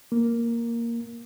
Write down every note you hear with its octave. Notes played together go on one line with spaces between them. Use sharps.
A#3